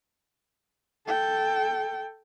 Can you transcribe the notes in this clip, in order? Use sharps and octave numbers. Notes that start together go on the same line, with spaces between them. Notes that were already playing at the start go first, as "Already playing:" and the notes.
A4 G5